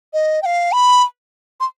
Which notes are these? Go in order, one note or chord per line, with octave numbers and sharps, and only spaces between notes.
D#5
G5
F5
B5
C6